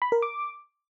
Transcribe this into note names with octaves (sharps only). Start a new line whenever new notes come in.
B5
A#4
D6